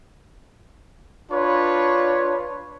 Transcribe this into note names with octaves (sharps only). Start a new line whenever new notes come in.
D4 F4 B4 C#5